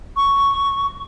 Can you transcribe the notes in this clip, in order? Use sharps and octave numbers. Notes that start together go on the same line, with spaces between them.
C#6